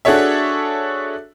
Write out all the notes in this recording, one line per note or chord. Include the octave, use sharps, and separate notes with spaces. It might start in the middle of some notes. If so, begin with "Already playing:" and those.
D4 F#4 G#4 A4 C#5 E5